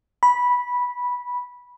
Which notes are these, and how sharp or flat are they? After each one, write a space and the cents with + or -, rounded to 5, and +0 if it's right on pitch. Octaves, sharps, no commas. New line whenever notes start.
B5 -10